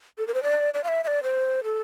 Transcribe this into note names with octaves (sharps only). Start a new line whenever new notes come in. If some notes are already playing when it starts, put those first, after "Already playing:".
A4
A#4
C5
D5
D5
F5
E5
E5
D5
C5
A4